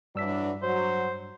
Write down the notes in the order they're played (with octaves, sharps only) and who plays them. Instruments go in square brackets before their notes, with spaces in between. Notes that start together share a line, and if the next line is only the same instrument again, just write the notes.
[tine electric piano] G2 E6 B6 [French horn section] E3 F#3 D4
[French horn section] F#3 [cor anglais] C5